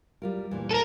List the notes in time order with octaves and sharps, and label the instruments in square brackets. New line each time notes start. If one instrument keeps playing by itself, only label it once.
[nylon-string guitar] G3 F4 A#4
D2 A#2 E3
[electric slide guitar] A4 A#4